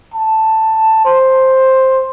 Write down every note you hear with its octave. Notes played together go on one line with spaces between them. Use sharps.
A5
C5